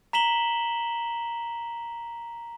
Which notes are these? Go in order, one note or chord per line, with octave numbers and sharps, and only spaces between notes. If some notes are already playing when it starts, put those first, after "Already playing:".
A#5 B6 E7 F#7 G7